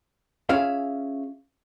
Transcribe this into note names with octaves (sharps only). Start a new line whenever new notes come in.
C#4 F4 G#4 E5 F5